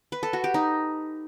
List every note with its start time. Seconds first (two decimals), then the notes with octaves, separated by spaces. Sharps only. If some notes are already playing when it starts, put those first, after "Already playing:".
0.12 B4
0.23 A4
0.33 F#4
0.44 G4
0.54 D#4